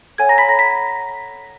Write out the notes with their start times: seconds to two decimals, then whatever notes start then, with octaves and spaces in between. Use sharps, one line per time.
0.18 A4 C#5 F#5 G#5 G#6
0.29 A#5 A#6
0.38 B5 B6
0.48 A4 C#5 F#5 A#5 A#6
0.59 B5 B6